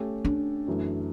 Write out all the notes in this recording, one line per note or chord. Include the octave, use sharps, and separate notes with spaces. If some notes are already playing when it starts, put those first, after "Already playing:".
Already playing: A3 C#4 G4
D4
F#2 E3 A3